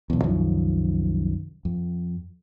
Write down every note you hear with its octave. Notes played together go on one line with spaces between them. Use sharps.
B1 E2
C2 F#2 D#3 F3
F2